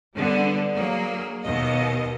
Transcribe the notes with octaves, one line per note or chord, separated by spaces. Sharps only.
D3 G3 B3
F#3 A#3 G#4
D#2 B2 D#5